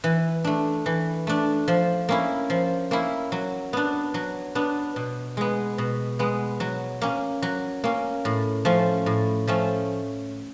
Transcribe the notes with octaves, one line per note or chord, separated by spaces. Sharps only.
E3
A3 D4
E3
A3 D4
F3
A#3 C#4 E4
F3
A#3 C#4 E4
F#3
B3 D4
F#3
B3 D4
B2
G#3 B3
B2
G#3 B3
F#3
A#3 C#4
F#3
A#3 C#4
A2
F3 A3 C#4
A2
F3 A3 C#4